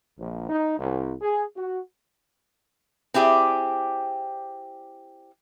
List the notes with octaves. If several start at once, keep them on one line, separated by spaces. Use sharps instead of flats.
A#1
D#4
C2
G#4
F#4
C4 E4 G4 G#4 D5